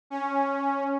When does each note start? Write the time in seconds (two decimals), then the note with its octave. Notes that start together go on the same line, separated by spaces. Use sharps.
0.10 C#4